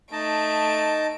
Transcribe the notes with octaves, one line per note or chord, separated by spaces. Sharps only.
A3 D#4 D#5 A5 D7